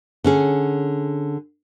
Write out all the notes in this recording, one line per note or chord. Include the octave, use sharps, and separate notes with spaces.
D3 C#4 G#4